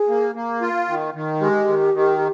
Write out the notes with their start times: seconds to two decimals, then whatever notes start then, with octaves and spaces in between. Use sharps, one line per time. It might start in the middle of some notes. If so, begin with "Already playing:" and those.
Already playing: G#4
0.09 A#3
0.35 A#3
0.61 F4
0.88 D#3
1.14 D#3
1.40 G#3 G4
1.68 D#3
1.94 D#3